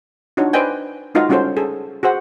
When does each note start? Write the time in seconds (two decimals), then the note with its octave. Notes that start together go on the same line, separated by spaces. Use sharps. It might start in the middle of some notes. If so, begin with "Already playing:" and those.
0.37 D4 D#4 F4 F#4 C#5
0.53 B4 C5 D5 D#5 G5 G#5
1.15 G#3 D#4 F4 F#4 D#5 F5
1.29 G3 C#4 F4 F#4 A4 C5
1.57 G#4 A4
2.03 F#4 G#4 C5 F#5